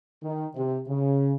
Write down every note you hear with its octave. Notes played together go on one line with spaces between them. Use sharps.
D#3
C3
C#3